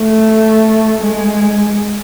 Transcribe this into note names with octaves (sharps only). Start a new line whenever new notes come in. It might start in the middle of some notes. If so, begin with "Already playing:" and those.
Already playing: A3
G#3